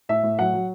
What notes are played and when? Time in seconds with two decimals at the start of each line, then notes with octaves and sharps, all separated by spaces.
0.09 A2 E5
0.23 A2
0.39 F#3 F#5
0.54 F#3